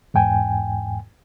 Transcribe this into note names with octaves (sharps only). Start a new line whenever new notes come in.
E2 G#2 G5 G#5